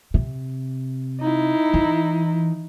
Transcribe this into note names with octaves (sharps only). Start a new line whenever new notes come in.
C3
D#4 E4
E3